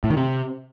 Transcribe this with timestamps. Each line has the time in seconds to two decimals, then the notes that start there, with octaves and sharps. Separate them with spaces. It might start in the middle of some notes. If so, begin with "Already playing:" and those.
0.04 A2
0.10 D#3
0.17 C3